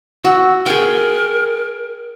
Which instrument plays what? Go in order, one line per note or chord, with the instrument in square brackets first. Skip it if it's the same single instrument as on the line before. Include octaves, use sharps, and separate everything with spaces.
[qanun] F#4 [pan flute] E6
[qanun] G#4 G5 [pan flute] A#4